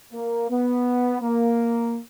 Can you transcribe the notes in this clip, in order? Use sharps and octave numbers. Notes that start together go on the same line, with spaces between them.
A#3
B3
A#3